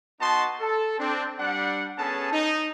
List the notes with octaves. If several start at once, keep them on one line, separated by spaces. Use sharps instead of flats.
B3 D#4 F#4 D#5 A5 C6
A4
C4 D4
G3 D4 F#5
B3 C#4 G#4 A4 A5
D#4